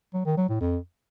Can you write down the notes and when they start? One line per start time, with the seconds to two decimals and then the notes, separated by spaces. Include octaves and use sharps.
0.14 F#3
0.26 D#3
0.37 F#3
0.49 A2
0.60 F2